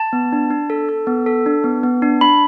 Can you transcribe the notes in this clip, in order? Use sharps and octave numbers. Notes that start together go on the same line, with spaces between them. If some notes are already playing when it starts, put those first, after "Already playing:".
Already playing: A5
B3
D4
D4
A4
A4
B3
A4
D4
B3
B3
D4
D4 B5